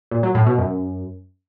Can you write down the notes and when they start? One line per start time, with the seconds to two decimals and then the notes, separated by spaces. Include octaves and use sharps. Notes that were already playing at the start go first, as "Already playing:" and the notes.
0.11 A#2
0.23 F#3
0.35 A2
0.47 B2
0.58 F#2